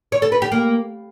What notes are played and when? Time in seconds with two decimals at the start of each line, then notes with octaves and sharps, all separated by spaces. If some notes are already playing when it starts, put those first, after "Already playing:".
0.12 C#5
0.22 A4
0.32 B4
0.42 G4
0.52 A#3